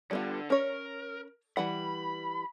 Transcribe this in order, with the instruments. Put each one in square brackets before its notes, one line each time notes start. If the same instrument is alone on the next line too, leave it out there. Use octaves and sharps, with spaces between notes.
[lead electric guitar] D3 [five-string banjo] G3 B3 F4
[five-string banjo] C#4 C#5 [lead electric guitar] A#4
[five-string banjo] E3 G3 F#5 [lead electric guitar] B5